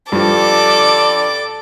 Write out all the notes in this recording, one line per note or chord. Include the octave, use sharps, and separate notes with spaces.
G2 F3 A4 D5 D6